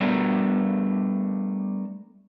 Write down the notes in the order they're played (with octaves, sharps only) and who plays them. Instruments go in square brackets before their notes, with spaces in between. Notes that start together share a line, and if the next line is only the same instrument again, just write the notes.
[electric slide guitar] G3 A3 B3 D4 A#4